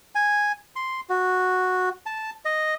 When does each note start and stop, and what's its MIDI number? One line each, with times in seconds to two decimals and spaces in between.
0.15 0.52 80
0.76 1.01 84
1.10 1.89 66
2.06 2.30 81
2.45 2.74 75